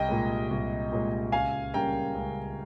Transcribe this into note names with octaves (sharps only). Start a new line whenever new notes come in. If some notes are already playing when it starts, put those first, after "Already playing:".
Already playing: C2 D#5 G5
A#2 G#3
C2
A#2 G#3
C#2 F5 G#5
C#3 G3 A#3 G5 A#5
C#2